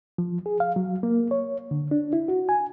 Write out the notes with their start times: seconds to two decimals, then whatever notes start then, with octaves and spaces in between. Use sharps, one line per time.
0.18 F3
0.46 G#4
0.60 F5
0.76 F#3
1.03 A#3
1.31 C#5
1.71 D3
1.91 D4
2.13 E4
2.28 F#4
2.49 G#5